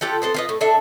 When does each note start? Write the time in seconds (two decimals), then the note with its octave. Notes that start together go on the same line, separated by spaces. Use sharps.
0.01 F4 G4 A4 F#5
0.22 B3 C4 A4
0.34 F4 B4 D#5
0.49 A2
0.61 D4 A4 E5